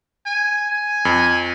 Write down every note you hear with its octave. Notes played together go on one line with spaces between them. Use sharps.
G#5
G#5
F2